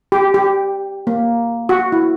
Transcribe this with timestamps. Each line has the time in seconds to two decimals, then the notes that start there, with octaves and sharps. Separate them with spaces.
0.12 G4
0.34 G4
1.07 A#3
1.69 F#4
1.92 E4